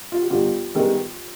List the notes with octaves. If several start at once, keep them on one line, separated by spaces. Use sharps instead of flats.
F4
F#4
G1 F4 G4
G2 D#3 G#3 B3